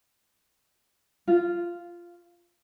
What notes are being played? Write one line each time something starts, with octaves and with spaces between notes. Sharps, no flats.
F4